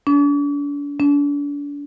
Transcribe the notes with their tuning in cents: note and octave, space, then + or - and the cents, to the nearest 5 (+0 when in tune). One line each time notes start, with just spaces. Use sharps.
D4 -40
D4 -35